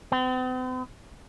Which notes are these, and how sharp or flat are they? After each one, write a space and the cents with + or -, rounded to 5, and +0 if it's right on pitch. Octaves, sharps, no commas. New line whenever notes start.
C4 -45